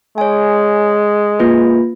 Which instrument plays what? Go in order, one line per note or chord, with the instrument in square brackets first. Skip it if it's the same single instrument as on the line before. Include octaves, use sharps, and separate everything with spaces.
[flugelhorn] G#3 [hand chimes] C#5 G#5
[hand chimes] A#3 F4 B4